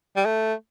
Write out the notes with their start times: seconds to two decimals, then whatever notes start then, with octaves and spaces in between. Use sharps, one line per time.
0.16 G3
0.25 A3